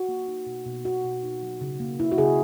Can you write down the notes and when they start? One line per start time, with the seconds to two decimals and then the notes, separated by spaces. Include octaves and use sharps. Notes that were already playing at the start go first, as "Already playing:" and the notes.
Already playing: F#4
0.09 A#3
0.28 D#4
0.46 B2
0.66 B2
0.85 B2 F#4
1.04 B2
1.23 D#4
1.42 F#3
1.61 C#3
1.80 A#3
2.00 C#3 E4
2.12 F#4
2.18 C#3 G#4